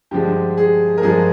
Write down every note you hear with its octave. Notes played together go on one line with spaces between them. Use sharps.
G2 D3 F3 G#3 G4
G#4
A#4
G2 D3 F3 G#3 G#4